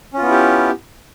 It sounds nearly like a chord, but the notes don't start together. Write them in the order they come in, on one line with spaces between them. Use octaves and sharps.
C#4 F4 B3 E4 G4